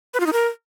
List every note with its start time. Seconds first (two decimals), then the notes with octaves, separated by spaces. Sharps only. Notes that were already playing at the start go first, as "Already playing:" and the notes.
0.14 B4
0.20 F4
0.26 D#4
0.33 A#4